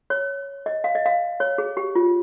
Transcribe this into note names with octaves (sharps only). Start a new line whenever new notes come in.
C#5
D#5
F5
D#5
F5
C#5
G#4
G4
F4